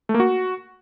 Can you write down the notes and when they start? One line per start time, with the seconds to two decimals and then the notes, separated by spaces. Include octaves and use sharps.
0.09 A3
0.14 A#3
0.20 F#4